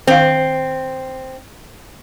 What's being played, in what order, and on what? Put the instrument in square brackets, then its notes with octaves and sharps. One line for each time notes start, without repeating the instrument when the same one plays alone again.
[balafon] D#3 F5 [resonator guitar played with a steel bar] C4